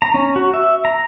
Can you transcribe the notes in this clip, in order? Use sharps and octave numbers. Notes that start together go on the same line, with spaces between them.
A#5
C#4
F#4
E5
A#5